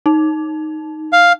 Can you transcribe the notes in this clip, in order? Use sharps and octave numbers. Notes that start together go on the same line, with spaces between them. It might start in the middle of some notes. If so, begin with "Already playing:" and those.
D#4
F5